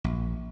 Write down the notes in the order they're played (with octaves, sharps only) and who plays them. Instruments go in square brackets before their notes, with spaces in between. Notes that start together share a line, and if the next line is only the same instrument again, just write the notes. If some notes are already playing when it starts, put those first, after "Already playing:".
[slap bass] A#1